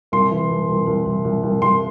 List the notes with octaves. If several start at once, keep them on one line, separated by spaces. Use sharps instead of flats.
C2 C6
E3
C2
C2
C2
C2
C2
C2
C2 C6